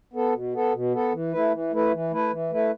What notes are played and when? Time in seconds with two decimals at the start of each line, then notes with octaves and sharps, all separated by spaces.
0.14 B3 A4
0.33 B2
0.53 B3 A4
0.73 B2
0.93 B3 A4
1.13 E3
1.32 A3 E4 B4
1.52 E3
1.72 A3 E4 B4
1.92 E3
2.11 A3 E4 B4
2.31 E3
2.51 A3 E4 B4